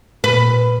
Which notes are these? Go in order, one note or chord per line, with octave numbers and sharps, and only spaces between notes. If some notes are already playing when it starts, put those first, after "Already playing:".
A#2 B4